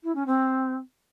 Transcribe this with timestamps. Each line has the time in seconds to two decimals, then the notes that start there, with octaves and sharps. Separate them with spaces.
0.03 E4
0.15 C#4
0.27 C4